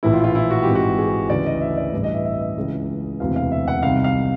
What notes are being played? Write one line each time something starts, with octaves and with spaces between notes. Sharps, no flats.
A#1 A2 E3 E4
F4
F4
E4
F#4
G#1 G#2 E3 G4
F#4
G#4
D2 C#3 E3 D5
D#5
E5
D5
A1 G2 E3
D#5
E5
E5
D#5
C#2 C#3 E3
E1 D2 C3 E3 F5
F5
E5
F#5
C2 C3 D#3 F5
F5